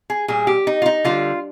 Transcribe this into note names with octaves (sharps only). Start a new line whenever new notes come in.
G#4
A#2 G3 G#4
G4
D#4
F4
D#4
D3 G3 F4